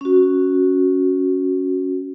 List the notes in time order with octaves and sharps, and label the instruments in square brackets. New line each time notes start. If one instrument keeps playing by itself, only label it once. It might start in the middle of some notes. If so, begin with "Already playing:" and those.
[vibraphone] C#4 F#4